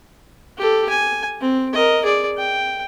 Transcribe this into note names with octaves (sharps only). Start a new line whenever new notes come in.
G4 A4
G#5
C4
A#4 D#5
G#4 D5
G5